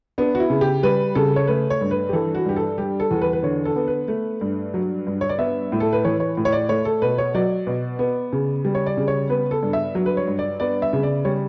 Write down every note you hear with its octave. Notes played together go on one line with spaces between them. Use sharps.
B3 D4
F#4
E4
C#3
G4
G3 B4
C#3 A4
C#5
A3 B4
C#5
G2
B4
G4
E3 A4
F#4
G2 G4
A4
G3 G4
A4
E2
B4
B4
D3 C#5
A4
B3
B4
A3
G2
F#3
G2
C#5
D5
B3 E5
A2
A4
B4
E3 C#5
C#5
A2
C#5
D5
A3 C#5
A4
B2 B4
C#5
F#3 D5
B2
B3
C#3
G3
C#5
D5
C#3
C#5
B3 B4
A4
G2
E5
F#3
B4
C#5
G2
D5
B3 D5
E5
C#3
D5
G3 C#5